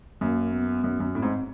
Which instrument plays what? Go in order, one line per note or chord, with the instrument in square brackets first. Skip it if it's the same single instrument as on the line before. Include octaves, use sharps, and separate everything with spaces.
[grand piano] F#2 [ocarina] A#3
[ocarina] B3
[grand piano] F#2
F#2
[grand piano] A2 [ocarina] C4
[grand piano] G#2